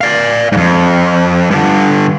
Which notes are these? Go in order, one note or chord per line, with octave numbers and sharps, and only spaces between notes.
D5 F5
F2 G#2
G2 D3